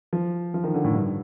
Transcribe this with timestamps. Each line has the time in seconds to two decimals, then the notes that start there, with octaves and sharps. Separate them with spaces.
0.13 F3
0.54 F3
0.64 D#3
0.74 D3
0.84 A2
0.95 G2